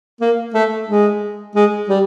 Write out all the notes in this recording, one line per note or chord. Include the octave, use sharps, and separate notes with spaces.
A#3
A3
G#3
G#3
G3